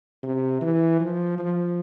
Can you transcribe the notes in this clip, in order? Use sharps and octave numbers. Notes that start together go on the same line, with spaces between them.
C3
E3
F3
F3